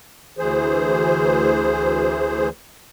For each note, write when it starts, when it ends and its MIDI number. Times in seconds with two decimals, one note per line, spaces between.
0.38 2.49 38
0.38 2.49 52
0.38 2.49 68
0.38 2.49 72